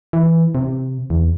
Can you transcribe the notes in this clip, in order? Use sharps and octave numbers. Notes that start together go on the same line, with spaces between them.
E3
C3
E2